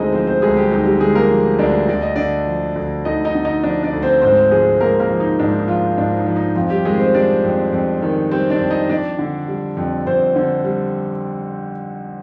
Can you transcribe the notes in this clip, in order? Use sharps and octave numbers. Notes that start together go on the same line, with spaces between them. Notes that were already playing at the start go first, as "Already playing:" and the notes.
Already playing: D2 D3 G#3 C4 D#4 G#4 C5 D#5
F3 C4 C5
C4 C5
D2 G#3 G#4
G3 G4
D2 D#4
G3 G4
D3 G#3 G#4
A#3 A#4
F3
D2 D4 D5
D2 D5
D#5
D3 D4 D5
F3
D2
D2 D#4 D#5
D#4 D#5
D3
D#4 D#5
F3 D4 D5
D4 D5
D2
C4 C5
G#2 C4 C5
F3 G#3 G#4
G#2 A#3 A#4
A#3 A#4
F3
D#4
G#2 D4
D#4
F3 F4
G#2 D4
D#4
F3
D#4
F2 F3 F4
G3 G4
D#3 G#3 G#4
C4 C5
G3 D4 D5
F2
F2
D#3
G3 C4 C5
D4 D5
F2
D#4 D#5
F2 D4 D5
D3
G3
F2
F2 C4 C5
D3
G3